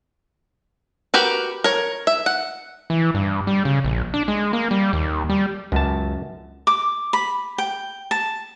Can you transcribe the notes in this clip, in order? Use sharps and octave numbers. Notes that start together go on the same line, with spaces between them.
F#4 G4 A#4 B4
A#4 C#5
E5
F#5
E3
G2
G3
C#3
A#1
D4
G#3
A#3
G3
D#2
G3
C#2 F#2 A5
D6
B5
G5
A5